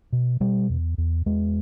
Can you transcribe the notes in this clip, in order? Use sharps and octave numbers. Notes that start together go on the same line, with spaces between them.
B2
B2 G3
E2
E2
E2 G#3